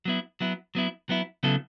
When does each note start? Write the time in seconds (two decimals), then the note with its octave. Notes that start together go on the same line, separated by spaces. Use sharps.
0.05 F#3 B3 E4
0.41 F#3 B3 E4
0.75 F#3 B3 E4
1.09 F#3 B3 E4
1.43 C#3 F#3 B3 E4 A4